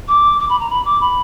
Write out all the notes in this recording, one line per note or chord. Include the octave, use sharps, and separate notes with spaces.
D6
D6
B5
A#5
B5
D6
B5